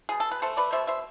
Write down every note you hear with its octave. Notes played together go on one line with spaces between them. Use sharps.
B2 G#4
A4
B4
A3 A4 C5
B4 D5
B2 C5 E5
C5 E5